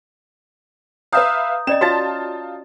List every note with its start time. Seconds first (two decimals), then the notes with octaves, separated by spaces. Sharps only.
1.12 B4 E5 F5 A#5 D#6 G6
1.67 C#4 D5 D#5 E7
1.81 F4 F#4 C#5 A5 A6